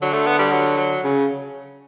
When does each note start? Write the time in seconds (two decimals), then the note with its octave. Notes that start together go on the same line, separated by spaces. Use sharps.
0.02 D3 F#3
0.13 A3
0.26 B3
0.39 G3
0.52 F#3
0.77 F#3
1.04 C#3